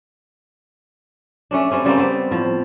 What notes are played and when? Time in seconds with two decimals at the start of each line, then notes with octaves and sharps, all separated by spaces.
1.51 A3 C#4 D4
1.71 G3 C4 C#4
1.84 C#3 G3 A#3 C4
1.97 B3 C4
2.31 A2 F3